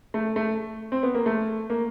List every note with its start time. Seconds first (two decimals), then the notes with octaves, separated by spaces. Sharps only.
0.14 A3
0.36 A3
0.92 C4
1.03 B3
1.14 A#3
1.26 A3
1.70 A#3